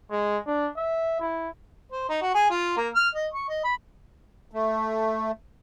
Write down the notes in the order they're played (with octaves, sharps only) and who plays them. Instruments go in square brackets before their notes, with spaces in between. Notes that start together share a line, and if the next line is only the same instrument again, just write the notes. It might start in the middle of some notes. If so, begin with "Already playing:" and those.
[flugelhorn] G#3
D4
E5
E4
[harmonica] C5
D#4
F#4
G#4
F4
A#3
F6
D#5
C#6
D#5
B5
[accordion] A3